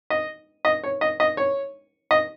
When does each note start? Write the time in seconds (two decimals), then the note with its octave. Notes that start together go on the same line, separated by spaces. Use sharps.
0.10 D#5
0.65 D#5
0.84 C#5
1.01 D#5
1.20 D#5
1.37 C#5
2.11 D#5